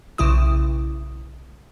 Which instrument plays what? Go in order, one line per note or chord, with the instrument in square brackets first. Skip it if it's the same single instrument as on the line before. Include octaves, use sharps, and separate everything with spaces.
[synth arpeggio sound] B1 C#3 E4 D#6